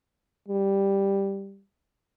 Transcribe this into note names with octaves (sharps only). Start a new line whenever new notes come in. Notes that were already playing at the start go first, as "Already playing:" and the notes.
G3